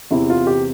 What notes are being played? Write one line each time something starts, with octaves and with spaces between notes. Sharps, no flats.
E2 C3 E3 E4
F4
G4